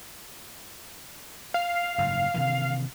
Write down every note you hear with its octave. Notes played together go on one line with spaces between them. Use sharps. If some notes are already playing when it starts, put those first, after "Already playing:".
F5
F#1 G#2
C3 D#3 E3